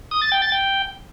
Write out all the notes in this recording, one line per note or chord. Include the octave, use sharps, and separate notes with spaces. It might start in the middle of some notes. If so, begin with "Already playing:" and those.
D#6
A6
G5
A6
G5